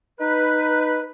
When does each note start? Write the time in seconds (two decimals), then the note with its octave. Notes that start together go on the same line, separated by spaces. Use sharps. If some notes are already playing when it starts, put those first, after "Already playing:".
0.20 D#4 B4